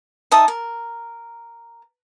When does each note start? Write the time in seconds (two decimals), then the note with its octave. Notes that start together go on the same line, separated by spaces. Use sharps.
0.31 D#4 E5 A5 D#6
0.48 A#4